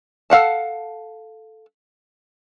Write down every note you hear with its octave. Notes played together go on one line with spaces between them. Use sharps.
A4 F5 F#5 A5